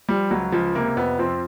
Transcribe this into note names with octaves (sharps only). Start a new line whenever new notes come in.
F3 G3
C#2 F#3
C#2 F3
C3 A#3
F2 B3
F3 C4